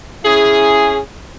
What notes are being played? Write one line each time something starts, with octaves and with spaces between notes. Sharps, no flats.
C#4 E4 G#4